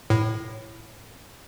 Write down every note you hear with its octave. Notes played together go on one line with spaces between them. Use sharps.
A2